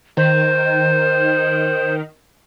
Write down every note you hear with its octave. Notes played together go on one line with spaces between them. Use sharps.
D#3 C5